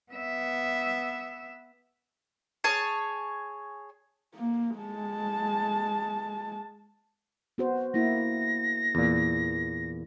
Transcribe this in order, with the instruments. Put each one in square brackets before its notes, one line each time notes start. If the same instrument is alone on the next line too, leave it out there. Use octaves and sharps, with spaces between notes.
[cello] B3 E5
[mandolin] G#4 C#5 A5
[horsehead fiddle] A#3
G#3 A5
[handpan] B3 F#4 C5
[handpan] A#3 E4 [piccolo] A#6
[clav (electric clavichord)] E2 A#2